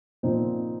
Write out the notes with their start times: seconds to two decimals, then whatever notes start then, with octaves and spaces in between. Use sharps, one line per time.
0.23 A#2 F3 C4 D#4